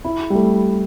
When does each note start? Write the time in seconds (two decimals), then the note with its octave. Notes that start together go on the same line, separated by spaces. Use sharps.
0.04 E4
0.30 G3
0.35 A3